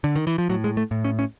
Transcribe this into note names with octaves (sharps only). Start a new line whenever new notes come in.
D3
D#3
E3
F3
A2 F#3
G#3
A3
A2
C#4
C#4